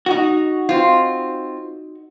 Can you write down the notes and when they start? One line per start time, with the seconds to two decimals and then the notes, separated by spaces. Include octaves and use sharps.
0.06 D#4 F#4
0.69 C4 F4